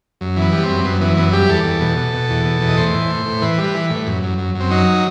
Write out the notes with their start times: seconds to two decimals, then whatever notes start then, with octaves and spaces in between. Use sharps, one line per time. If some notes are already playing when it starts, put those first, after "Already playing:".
0.21 F#2
0.36 E3
0.42 B3
0.52 G3
0.63 C4
0.69 F#2
0.85 F#2 B3
1.01 E3 B3
1.17 F#2 B3
1.33 G3 G4
1.49 E2 A4
1.65 E2
1.81 B2
1.97 B2
2.13 B2
2.30 E2
2.45 B2
2.62 E2
2.69 D#5
2.77 A2 C5
2.94 E3
3.10 A2
3.25 A2
3.42 E3 B4
3.58 G3
3.64 B4
3.74 E3
3.90 A2
4.06 F#2
4.23 F#2
4.38 F#2
4.55 F#2
4.60 C4
4.71 F#3 D#4